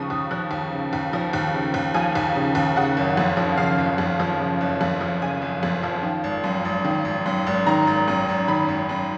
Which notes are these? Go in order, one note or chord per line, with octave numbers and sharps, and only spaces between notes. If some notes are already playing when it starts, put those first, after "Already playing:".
Already playing: D#2 C#3 F3 C#6 D#6
D#2
F3 F#6
D#2
C#3
D#2
F3
D#2
C#3
D#2
F3 G#5
D#2
C#3
D#2
C#3 F#5
F#1
F2
F3
C#3 F5
F#1
F2
F3
C#3
F#1
F2
F3
C#3 G#5
F#1
F2
F3
D#3
G#1
F#2
G#1
D#3
G#1
F#2
G#1
D#3 A#5
G#1
F#2
G#1
D#3 B5
G#1
F#2